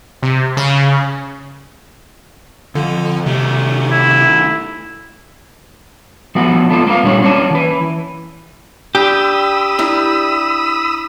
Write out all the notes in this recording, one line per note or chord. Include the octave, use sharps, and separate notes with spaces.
C3
C#3
F2 D3
C3 D#3 A3
E4
F3 A3 B3 F#4
A3 B3 D4 F4 A4
A#3 B4 F5
A#2 G3 D4 C#5
F#3 A#3 C#4 D4
E3 B4
D4 G4 B5 D#6 E6
D4 E4 A#4